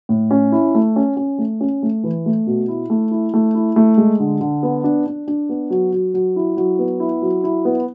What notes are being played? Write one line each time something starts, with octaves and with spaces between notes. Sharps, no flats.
A2
C#4
E4
A3
C#4
C#4
A3
C#4
A3
E3
A3
B2
E4
A3
E4
A3
E4
A3
G#3
D3
D3
B3
D4
D4
D4
B3
F#3
F#3
F#3
E4
F#3
B3
E4
F#3
E4
B3